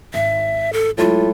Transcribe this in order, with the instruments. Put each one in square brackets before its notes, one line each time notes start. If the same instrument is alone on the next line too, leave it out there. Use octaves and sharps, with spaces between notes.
[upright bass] G#1 [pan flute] E5
[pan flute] A4
[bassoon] A2 [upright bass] F#3 G#3 [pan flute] F4